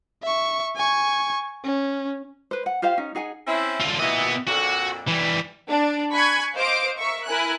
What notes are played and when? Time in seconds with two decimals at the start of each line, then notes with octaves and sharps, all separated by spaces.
0.23 E5 C#6
0.75 G#5 C#6
1.64 C#4
2.51 B4 C5
2.66 F#5
2.82 F4 G4 C5 F5
2.98 C#4 D#4
3.15 D#4 G#4 F#5 G#5
3.47 C4 C#4 E4
3.80 D3 F4
3.99 A#2 E3 B3 D#5
4.47 F2 A#2 D3 F#4
5.08 E3 G3
5.69 D4
6.12 G#5 B5 C#6 F#6 G#6
6.55 C5 D#5 F5 D6 D7
6.97 A#4 E5 C#6
7.26 E4 A#4 G#5 F#6